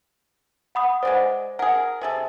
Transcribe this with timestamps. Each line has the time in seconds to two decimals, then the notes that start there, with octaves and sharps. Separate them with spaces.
0.75 F#5 B5 D#6
1.03 G#3 C4 C5 D5 F#5
1.59 G#4 A#4 F#5
2.01 C3 G#4 A4